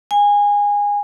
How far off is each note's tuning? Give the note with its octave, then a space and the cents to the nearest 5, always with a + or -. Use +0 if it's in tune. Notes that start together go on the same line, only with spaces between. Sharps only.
G#5 -20